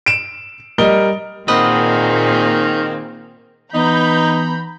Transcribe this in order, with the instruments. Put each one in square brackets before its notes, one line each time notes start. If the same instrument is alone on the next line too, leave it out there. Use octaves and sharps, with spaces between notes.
[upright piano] D7 E7
G3 A#4 D#5 G7
[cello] A#2 G#4 [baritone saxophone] D#3 [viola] A#3 C4 [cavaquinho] B4 D#5 F#5
[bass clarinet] E3 [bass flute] B3 [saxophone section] D#4 [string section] A#5 B5 G6